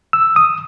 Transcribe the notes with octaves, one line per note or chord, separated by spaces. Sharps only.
E6
D#6